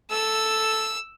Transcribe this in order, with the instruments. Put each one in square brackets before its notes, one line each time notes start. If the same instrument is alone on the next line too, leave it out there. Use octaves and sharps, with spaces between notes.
[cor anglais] A4 [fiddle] E6